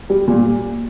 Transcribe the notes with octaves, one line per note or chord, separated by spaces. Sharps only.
G3
A#2